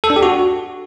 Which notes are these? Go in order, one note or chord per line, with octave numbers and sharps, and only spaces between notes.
A4
D4
G4
F#4